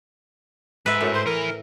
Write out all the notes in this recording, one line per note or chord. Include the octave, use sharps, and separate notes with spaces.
G#2 B4 E5
F#2 A2
C5
E4 A#4 B4